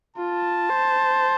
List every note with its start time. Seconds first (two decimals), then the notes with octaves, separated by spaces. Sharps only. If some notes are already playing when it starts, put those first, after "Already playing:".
0.17 F4 A5
0.69 C5